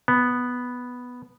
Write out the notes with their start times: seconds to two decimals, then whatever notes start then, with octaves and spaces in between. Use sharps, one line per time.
0.08 B3